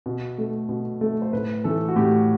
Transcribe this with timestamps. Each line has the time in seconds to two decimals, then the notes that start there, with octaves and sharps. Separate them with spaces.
0.06 B2
0.38 A3
0.69 B2
1.01 A3
1.22 C5
1.33 A2 B4
1.64 E3 A3 A4
1.88 F#4
1.96 A2 G4